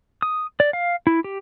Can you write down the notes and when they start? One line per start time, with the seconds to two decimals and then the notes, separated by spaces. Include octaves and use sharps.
0.22 D#6
0.60 D5
0.73 F5
1.07 E4
1.24 G4